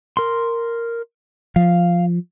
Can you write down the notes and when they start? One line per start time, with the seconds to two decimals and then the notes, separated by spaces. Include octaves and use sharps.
0.17 A#4 C6
1.56 F3 F5